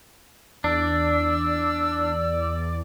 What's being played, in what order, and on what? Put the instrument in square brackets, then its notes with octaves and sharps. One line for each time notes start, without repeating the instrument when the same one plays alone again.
[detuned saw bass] E2 [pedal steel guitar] D4 [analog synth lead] D5 [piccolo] E6